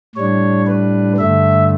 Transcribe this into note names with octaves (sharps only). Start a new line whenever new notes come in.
A2 G3 D4 C#5
B4
G2 D3 A3 E5